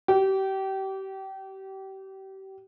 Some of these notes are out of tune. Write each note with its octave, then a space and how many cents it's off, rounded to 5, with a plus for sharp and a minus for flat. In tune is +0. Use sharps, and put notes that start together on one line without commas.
G4 -30